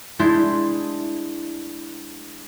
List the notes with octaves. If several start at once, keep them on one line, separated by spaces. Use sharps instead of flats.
G#3 D4 E4 C6 G6 B6